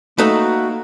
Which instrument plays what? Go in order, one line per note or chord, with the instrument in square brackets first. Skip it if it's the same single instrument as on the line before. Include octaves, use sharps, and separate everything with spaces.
[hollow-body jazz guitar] A3 [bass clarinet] A#3 [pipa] D#4 B4 [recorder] F#4